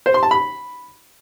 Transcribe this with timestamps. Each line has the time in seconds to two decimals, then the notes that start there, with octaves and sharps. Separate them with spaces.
0.06 C5
0.14 C6
0.23 A5
0.31 B5